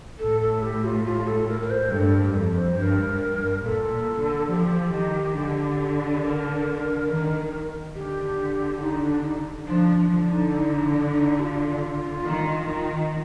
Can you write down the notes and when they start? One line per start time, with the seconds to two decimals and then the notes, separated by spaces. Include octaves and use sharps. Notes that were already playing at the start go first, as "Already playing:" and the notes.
0.19 A2 A4
0.41 A4
0.63 G4
0.84 F4
1.05 F4
1.27 A4
1.49 A#4
1.61 A#4
1.70 C5
1.91 G2 A4
2.13 A#4
2.25 G4
2.34 F2 A4
2.56 C5
2.78 G2 C5
2.82 A#4
3.06 G2
3.35 G2
3.64 A#2 A4
3.93 A#2
4.22 D3
4.50 F3 G4
4.93 D#3
5.36 D3
6.22 A#4
7.08 D#3
7.95 D3 G4
8.81 D#4
9.03 D4
9.24 D#4
9.67 F3 D4
9.89 D4
10.10 D3 D4
10.32 D#4
10.53 D#4
10.75 D#4
10.92 D#4
10.96 D4
11.18 D#4
11.39 G4
11.43 F4
12.25 D#3
12.69 D#3